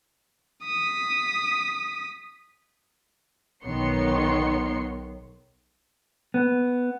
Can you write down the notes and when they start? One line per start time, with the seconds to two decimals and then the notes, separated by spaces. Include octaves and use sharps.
0.64 D#6 B6
3.64 B1 D#3 B3 C#5 C6 C#7
6.34 B3